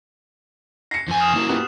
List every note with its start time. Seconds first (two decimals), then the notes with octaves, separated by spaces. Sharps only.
0.91 A#6 C7 C#7
1.08 F2 G#5
1.20 D#6 F6 E7
1.34 A#3 E4 F#4 E7
1.49 B3 F4 G4